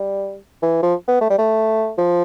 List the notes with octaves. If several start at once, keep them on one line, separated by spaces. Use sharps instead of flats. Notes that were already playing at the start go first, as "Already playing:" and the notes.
Already playing: G3
E3
F3
B3
A3
G3
A3
F3